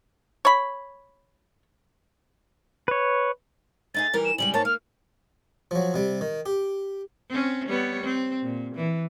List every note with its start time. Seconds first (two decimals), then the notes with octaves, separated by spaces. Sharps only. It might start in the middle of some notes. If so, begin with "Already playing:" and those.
0.45 C#5 B5
2.88 B4 C#5
3.94 A3 D#4 G#4 A6
4.14 E3 G3 A#4
4.25 E7
4.38 C#3 G3 G#3 F#7
4.54 G#2 A#3 C#5 A5
4.65 A#3 F6
5.71 F3 F#3
5.94 C3 G3
6.21 D#3
6.46 G4
7.30 C4 C#4
7.69 G3 B3 C#5
8.03 C4
8.43 A#2
8.75 E3